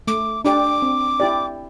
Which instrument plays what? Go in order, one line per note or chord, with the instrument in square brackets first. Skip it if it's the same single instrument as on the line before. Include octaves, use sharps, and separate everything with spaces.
[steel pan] A3 [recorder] D6
[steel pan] D4 G4 D5 [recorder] D6
[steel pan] C4
E4 G4 D5